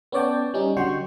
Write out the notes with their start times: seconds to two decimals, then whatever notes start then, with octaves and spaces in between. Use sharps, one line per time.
0.12 B3 C#4 C#5 D5 G5 A5
0.54 G3 C#4 D#4
0.77 D3 F#3 F#4 G5 C6 C#6